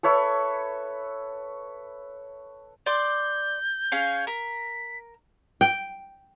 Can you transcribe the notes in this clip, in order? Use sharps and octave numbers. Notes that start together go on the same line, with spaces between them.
A4 B4 C#5 E5
D5 C6 D6 G6
C#4 G#4 F5
A#4 B6
G5